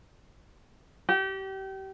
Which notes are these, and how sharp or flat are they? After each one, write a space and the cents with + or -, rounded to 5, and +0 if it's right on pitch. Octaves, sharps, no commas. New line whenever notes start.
G4 -30